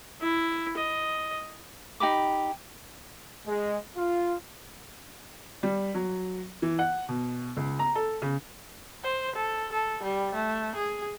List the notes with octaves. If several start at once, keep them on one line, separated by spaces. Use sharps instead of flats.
E4
D#5
D#4 G4 B5 D6
G#3
F4
G3
F#3
E3
F#5
B2
C#2
A#5
A4
C#3
C5
A4
A4
G3
A3
G#4